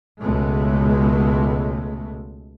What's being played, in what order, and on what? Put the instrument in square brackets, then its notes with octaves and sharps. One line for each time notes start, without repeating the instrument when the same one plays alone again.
[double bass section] C#2 B2 G#3 A3